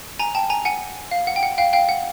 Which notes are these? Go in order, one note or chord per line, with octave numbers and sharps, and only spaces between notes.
G#5 A#5
G5 A5
G#5 A#5
F#5 G#5
F5
F#5
G5
F#5
F5 G5
F5 G5
F#5